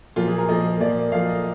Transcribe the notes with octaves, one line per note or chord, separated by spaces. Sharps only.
A#2 F3 A#3 F4
G#4
A#4
A#2 F3 A#3 D#5
A#2 F3 A#3 D5
A#2 F3 A#3 F5
D#5